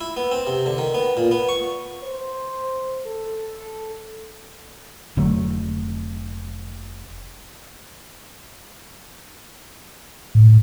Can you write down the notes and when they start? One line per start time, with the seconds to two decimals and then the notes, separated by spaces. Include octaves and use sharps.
0.01 E4
0.17 B3
0.31 C4
0.47 C3
0.66 D3
0.78 D#3
0.94 B3
1.17 A#2
1.31 B3
1.49 C#6
2.04 C5
3.06 A4
5.17 F1 D3 F#3 A3
10.35 A2